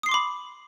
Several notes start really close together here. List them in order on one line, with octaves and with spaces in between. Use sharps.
D#6 C7 C6 D6 B5